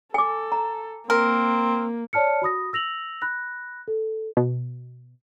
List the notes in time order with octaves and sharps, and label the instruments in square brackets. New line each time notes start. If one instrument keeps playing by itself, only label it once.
[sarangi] A4 [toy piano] G#5 D6
[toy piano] A#5
[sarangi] A#3 [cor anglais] C4 [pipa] A#4
[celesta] C#5 D5 A5 F6 C#7
F#4 B5 D#6 A#6
E6 A#6 F7 F#7
B5 F#6 A#6
A4
[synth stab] B2